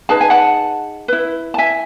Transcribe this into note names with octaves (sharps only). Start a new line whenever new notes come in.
D#4 G#4 B4 A5
G#5
F#5 A5
E4 B4
A5
E5 G#5